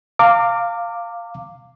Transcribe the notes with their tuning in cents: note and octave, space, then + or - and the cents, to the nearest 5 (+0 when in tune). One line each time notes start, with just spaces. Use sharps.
F5 +0 A#5 -35 D6 +0